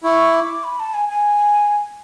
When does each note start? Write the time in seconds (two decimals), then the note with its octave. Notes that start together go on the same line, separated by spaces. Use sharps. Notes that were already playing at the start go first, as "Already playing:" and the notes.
0.04 E4 C#6
0.34 D6
0.64 B5
0.79 A5
0.94 G#5
1.09 G#5